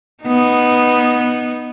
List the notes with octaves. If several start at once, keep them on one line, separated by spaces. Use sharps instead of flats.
B3 D#4